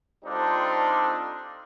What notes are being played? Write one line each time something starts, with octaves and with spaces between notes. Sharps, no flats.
G3 C4 D4 D#4 F4 A4